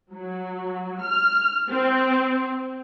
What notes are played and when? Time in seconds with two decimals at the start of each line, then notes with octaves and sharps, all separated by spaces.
0.13 F#3
1.01 F6
1.70 C4